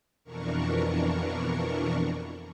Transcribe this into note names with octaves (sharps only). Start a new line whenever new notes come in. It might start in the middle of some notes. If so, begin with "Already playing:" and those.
F2 B2 E3 D4 A#4 C#6